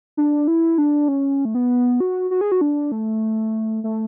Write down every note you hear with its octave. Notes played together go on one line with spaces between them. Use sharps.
D4
E4
D4
C#4
A3
B3
F#4
F#4
G#4
F#4
D4
A3
A3